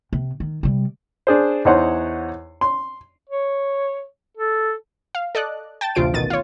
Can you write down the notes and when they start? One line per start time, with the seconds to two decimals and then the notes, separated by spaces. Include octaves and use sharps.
0.13 C3
0.40 D#3
0.63 C3 G3
1.27 D4 G#4 C5
1.65 E2 D#4 C5 C#5 F#5 C6
2.61 C6
3.29 C#5
4.37 A4
5.15 F5
5.35 A4 D5 D#5 F#6
5.81 G5 A5 A6
5.95 A1 D2 C3 F4 C5 D7
6.14 A1 B2 D#3 A6 D#7
6.30 F4 C#5